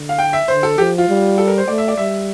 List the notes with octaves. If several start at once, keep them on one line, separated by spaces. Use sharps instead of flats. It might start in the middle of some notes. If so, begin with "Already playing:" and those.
Already playing: D3
F5
G5
E5
D3 C5
A4
F3 G4
F4
G3
A4
A#4
C5
A3 D5
E5
D5
G3 E5